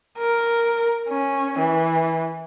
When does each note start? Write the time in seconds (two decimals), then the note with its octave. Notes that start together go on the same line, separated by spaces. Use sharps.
0.18 A#4
1.09 C#4
1.59 E3